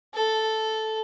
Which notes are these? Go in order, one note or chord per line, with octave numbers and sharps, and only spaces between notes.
A4